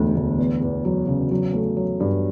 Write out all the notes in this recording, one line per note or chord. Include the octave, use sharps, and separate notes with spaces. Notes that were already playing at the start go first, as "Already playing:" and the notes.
Already playing: E1 D2 D3
D2
E2
E2
F#3
C#3
F#3
A3
F#3
G2